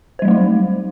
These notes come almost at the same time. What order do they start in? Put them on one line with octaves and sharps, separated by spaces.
C5 G3 F#3 A3 D#4